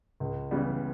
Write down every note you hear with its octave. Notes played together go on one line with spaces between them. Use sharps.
C#2
C#3 E3 G3 B3